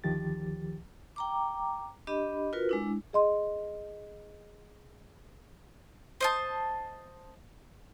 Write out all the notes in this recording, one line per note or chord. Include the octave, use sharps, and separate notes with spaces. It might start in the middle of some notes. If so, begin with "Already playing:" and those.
D2 D#3 F3 G4 A6
G5 A#5 D6
D4 G4 D#5 B5
F4 F#4 A#4 B4
G#3 D4 E4
G#4 D#5 C6
C5 D#5 A5